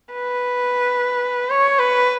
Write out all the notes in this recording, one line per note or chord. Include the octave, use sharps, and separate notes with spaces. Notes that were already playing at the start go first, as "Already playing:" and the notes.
B4
C#5
B4